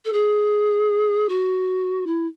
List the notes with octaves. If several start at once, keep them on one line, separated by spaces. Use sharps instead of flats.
A4
G#4
F#4
E4